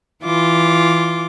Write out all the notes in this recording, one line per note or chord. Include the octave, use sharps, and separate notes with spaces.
E3 F4 D6